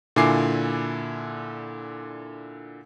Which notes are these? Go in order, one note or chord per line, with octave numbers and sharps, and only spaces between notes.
A#2 D3 E4 G#5 D6 C7